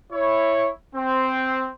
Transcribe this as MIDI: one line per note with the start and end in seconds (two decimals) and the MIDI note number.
0.12 0.69 64
0.12 0.69 73
0.95 1.69 60